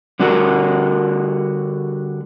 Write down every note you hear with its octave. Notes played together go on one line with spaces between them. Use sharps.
D3 G3 D4 F#4 A#4